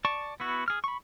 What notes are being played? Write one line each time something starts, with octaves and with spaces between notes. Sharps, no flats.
D5 A5 C#6
B3 E4 F#4
G#4 F6
B5 C#6